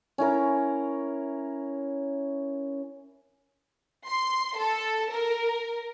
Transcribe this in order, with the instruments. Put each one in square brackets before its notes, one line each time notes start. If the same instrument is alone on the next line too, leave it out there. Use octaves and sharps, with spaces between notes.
[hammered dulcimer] C#4 E4 A#4
[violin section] C6
A4
A#4